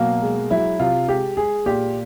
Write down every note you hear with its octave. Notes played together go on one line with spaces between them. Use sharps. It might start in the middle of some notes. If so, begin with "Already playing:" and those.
Already playing: B2 F#3 A#3
G#3
F#3 E4
C3 F4
G#3 G4
G#3 G#4
A#2 G4